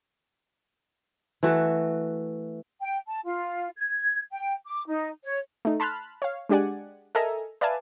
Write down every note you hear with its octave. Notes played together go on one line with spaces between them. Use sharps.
E3 A3 F#4
G5
A5
F4
G#6
G5
D6
D#4
C#5
A3 D#4
A5 B5 C6 F6 F#6
C#5 F5
G#3 D4 G4 D5 F#5 G#5
A4 A#4 D#5 E5 G#5 A#5
B4 D5 E5 F5 G#5 A5